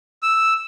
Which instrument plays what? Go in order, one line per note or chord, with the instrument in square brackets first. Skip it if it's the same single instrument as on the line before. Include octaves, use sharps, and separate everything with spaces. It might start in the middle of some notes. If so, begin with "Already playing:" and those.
[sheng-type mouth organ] E6